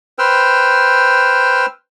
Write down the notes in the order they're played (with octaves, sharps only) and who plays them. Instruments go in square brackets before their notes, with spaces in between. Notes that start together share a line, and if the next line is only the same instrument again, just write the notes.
[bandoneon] B4 C5 G5 E6 F6